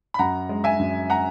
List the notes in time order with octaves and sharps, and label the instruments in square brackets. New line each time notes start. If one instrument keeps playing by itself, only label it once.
[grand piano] B5
F#2 F#5 A#5
G#3
E5 G#5
F#2
F#5 A#5